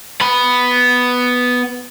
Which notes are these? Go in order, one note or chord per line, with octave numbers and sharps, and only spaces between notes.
B3 B5